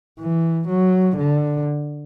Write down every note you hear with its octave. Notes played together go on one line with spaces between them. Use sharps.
E3
F#3
D3